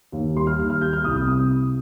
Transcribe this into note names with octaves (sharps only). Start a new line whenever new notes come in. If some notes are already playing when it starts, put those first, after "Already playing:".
D#2
G3 C6
F6
D#2 F6
F6
G3 G6
F6
C2 D#6
D#6
C3 D#6